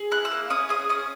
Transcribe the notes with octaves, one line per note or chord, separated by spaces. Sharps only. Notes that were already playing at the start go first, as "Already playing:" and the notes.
Already playing: G#4
E4 F#6
E6
A#3
C#4 D#6
G#4 D#6
C#4 D#6